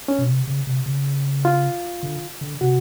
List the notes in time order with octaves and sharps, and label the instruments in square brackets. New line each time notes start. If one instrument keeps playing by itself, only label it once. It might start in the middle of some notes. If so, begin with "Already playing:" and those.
[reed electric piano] C#4
[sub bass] B2
C3
C#3
C3
C#3
[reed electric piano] F4
[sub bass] D3
D3
[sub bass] C3 [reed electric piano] F#4